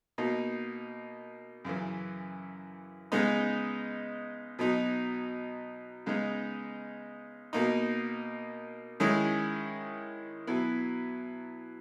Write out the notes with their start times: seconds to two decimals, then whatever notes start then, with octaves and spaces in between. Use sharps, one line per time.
0.18 B2 A#3 D#4
1.65 F#2 C#3 E3
3.12 C#3 G#3 B3 D#4
4.59 B2 F#3 B3 D#4
6.06 C#3 G#3 B3 D#4
7.53 B2 A#3 D#4
9.00 D#3 G#3 C#4 E4
10.47 B2 F#3 B3 E4